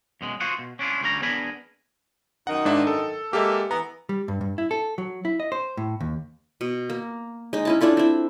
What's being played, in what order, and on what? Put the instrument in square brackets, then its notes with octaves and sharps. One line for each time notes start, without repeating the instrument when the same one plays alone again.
[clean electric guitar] F#2 B2 G#3
F4 F#4 G#4 C5 F#5
B2
C#4 D4 E4 F4
D2 G3 C#4 A#5
B3 D4 G#4 A#4 G#5 B5
[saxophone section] F#2 D#3 D#4 [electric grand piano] F#5
[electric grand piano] G#2 D4 E5
A4
[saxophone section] G#3 A#3 [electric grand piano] G4 A4 E5
[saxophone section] E3 B3 [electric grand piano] A#5
[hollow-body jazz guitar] G3
G2
G2
E4
A4
F#3
E4
D#5
C5
A2
D#2
[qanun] B2
A#3
G#3 D#4
C#4 E4 A5
D4 E4 F4 A4
C4 E4